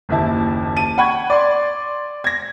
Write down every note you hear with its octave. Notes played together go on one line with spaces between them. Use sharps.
F#1 D#2 E4 A5
A5 D#7
F#5 G5 B5 C#6 G#6
D5 C6
G#6 A#6